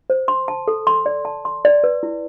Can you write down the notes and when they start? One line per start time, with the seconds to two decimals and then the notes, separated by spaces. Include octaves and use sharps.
0.10 C5
0.28 C6
0.48 A5
0.68 A4
0.87 C6
1.06 D5
1.25 A5
1.45 C6
1.65 D5
1.84 B4
2.03 E4